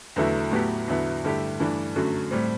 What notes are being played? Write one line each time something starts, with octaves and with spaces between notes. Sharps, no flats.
E2 D3 F#3 A3 E4
A2 F#3 B3 E4 G4
E2 D3 F#3 B3 E4
G2 D3 A3 E4 G4
G2 E3 A3 D4
F#2 D3 F#3 A3
A2 G3 C4